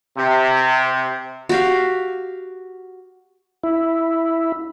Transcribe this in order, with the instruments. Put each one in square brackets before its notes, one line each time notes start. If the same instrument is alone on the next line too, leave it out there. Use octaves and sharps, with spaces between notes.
[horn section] C3
[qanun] F#4 G4 F5
[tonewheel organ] E4